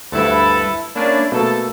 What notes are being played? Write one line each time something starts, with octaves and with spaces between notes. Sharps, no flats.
D2 G2 E4 A4 B4
A#3 C#4 D4 E4
B2 A3 A#3 A4